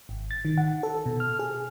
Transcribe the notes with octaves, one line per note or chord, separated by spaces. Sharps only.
G#1
A6
D#3
F#5
A4
B2
F6
G#4